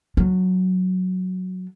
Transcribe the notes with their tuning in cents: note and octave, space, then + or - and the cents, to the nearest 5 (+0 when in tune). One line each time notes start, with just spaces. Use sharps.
F#3 +0 D4 +10